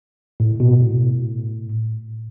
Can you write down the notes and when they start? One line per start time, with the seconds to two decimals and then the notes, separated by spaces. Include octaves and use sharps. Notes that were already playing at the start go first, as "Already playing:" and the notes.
0.40 A2
0.60 B2
0.81 A2